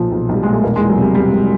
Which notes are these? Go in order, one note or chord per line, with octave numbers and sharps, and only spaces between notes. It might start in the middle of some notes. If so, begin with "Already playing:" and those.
Already playing: B1 A#2 F3
B1
B1 G3
A#2 G#3
A3
E1 A#3
G#3
E2
F#3
C3 G3
E1 G3
E1